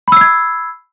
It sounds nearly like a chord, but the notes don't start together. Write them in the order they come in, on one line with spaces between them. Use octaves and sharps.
B5 E6 C7 G#6